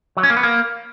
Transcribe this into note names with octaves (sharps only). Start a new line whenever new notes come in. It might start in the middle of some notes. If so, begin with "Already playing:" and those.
F#3
C#4
A#3
B3
A#3